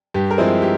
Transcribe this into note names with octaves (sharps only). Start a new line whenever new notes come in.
G2 G4
A#4
F3 G#3 C4 E4 G#4
G4